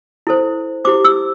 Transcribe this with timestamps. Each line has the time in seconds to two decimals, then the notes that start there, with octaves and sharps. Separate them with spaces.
0.27 E4 A4 C5
0.85 E4 G4 C5 D6
1.04 E6